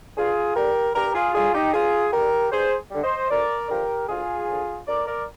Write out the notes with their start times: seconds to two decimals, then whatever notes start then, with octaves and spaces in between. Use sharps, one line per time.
0.17 G2 F4 G#4
0.56 D3 G3 G4 A#4
0.95 G2 G4 A#4
1.14 F4 G#4
1.34 D3 G3 F4 G#4
1.54 D#4 G4
1.73 G2 F4 G#4
2.13 D3 G3 G4 A#4
2.52 G2 G#4 C5
2.90 D3 G3
3.04 C5 D#5
3.30 D2 A#4 D5
3.69 D3 F3 G4 A#4
4.08 D2 F4 G#4
4.48 D3 F3
4.87 D2 A#4 D5
5.06 A#4 D5